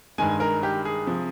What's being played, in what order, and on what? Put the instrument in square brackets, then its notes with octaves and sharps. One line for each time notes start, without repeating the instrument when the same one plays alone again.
[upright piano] G2 D#3 G#3 G#5
A#4
G4
G#4
C3 F3